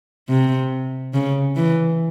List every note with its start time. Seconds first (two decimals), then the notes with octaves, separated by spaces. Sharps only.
0.29 C3
1.14 C#3
1.56 E3